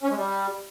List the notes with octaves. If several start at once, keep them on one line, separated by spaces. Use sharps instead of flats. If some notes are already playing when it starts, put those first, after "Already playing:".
C#4
G#3
G3